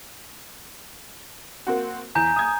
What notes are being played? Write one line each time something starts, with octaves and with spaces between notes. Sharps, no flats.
A#3 C4 F#4
E2 G#5 A#5 G6
D#6 G#6